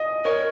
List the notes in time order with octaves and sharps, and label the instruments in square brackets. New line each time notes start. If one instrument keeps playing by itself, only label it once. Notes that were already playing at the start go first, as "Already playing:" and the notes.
Already playing: [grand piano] D#5
[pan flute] A#4 [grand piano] C#5